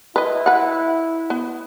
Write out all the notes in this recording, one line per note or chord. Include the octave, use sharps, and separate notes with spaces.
E4 B4 D#5
B4 F#5
B3